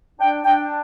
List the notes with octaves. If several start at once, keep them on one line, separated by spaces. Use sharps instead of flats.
D4 G5
D4 G5